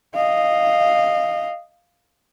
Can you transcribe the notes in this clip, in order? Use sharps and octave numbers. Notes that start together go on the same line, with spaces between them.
D#5 F5